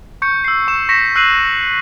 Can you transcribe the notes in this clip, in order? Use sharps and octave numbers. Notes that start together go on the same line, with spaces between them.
C#6 G6 C#7
E6 C7
C#6 E7
C#6 A#6 B6 C#7 E7
E6 F#6 C7 D#7 F#7